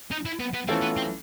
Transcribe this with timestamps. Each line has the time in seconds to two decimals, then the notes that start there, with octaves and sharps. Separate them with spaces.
0.11 D#4
0.26 E4
0.40 B3
0.54 B3
0.68 E3 A3 C4 C#4 F4 A4
0.82 B3
0.97 C4